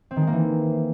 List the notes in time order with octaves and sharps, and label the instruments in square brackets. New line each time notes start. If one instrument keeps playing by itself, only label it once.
[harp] C4
D#3
G#3
A#3
E3